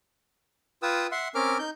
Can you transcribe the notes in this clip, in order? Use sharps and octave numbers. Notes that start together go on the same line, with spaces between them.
F4 B4 G5 D#6 E6
E5 F#5 C6
C4 C#4 A#4 D6 F6
D#4 G6